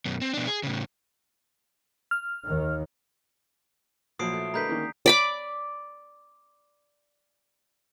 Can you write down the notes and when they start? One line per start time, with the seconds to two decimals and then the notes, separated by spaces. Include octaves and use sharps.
0.06 F#2 B2
0.21 C4
0.34 B2 D4
0.47 G#4
0.63 A2 C#3
2.11 F6
2.45 D#2 D#3
4.19 A#2 F3 F#3 E4 D#6 C7 D7
4.33 A3
4.54 D3 G#3 A3 A#4 B4 A#5 G6 B6
4.69 D#3 A#3 C#4
5.06 D5 B5 D6